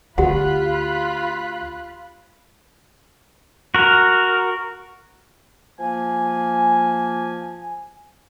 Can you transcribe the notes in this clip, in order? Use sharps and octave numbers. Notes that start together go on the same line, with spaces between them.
D2 F4 G4 F#5 B5 F#6
F#4 A#4
F3 A#3 G#5